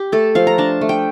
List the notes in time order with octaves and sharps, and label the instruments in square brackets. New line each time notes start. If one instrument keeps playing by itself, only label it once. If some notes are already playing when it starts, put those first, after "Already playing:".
Already playing: [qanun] G4
A3 A4
F3 F5
A#5
D4 A5
A3
G5